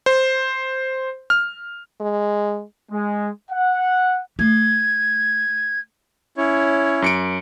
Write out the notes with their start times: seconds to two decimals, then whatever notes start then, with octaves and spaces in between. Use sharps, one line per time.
0.06 C5
1.30 F6
2.00 G#3
2.92 G#3
3.51 F#5
4.39 A3 G#6
6.37 C#4 E4 C#5
7.02 F#2 C#7 D7